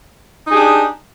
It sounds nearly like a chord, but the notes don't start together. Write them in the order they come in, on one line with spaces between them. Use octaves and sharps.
D#4 G#4 G4 D4